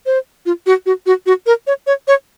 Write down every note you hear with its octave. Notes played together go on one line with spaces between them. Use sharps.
C5
F4
F#4
F#4
F#4
F#4
A#4
C#5
C#5
C#5